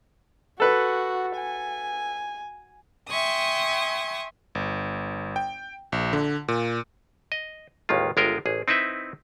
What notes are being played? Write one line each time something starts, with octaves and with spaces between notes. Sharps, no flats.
F#4 A4 B4
G#5
E5 G5 G#5 C6 C#6 D#6
G1
G5
A#1
D3
A#2
D#5
A1 D#2 D#3 G#3 F4
G1 G#3 F4 A#4 E5 G5
A1 G#4
C4 D#4 E4 B4 E5